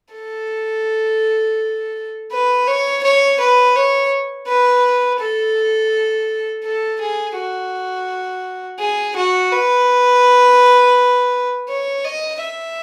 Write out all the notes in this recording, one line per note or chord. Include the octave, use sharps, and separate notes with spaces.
A4
B4
C#5
C#5
B4
C#5
B4
A4
A4
G#4
F#4
G#4
F#4
B4
C#5
D#5
E5